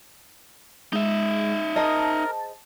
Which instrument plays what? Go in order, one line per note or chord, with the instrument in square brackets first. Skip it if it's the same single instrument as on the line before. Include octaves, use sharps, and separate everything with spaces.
[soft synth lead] G#3 [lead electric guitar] D#4 E5
[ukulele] G#4 C5 D#5 [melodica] A#4 [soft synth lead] A5